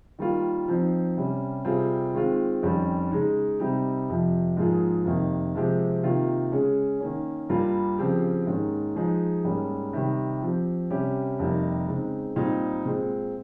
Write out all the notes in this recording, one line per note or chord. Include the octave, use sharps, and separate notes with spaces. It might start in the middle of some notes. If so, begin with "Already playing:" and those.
D#3 G3 A#3 F4
F3 C4 D#4
C3 G3 C#4
C3 G3 C4 F4 G#4
D#3 G#3 C4 F4
F2 D#3 G3 C#4
C#3 G#3 D#4
C3 G3 C4 D#4 G4
F2 C3 F3
G#2 F3 A#3 F4 G#4
F2 C3 D#3 A#3
C3 F3 G#3 C4 G4
C3 D#3 A#3 F4
C#3 G#3 C#4 G#4
D#3 A#3 C#4
G2 G3 A#3 F4
C#3 F3 C4 G4
G#2 D#3 A#3 C#4
F3 G#3 D#4 G#4
G#2 G3 A#3 C#4
C3 D#3 G3
F3 C4 G4
C3 G3 C#4 G4
F2 C3 G3 A#3 D#4
C#3 G#3 C4 D#4
A#2 G3 C4 D#4
A#2 G#3 C4